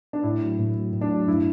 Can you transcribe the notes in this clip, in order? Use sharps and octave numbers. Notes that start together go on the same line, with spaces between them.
D4
A2 E4
F#3
A2
F#3
A2
D4
F#3
G2 E4